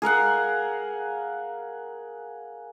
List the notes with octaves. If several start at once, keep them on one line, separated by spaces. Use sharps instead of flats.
G#4 A#4 F5 F#5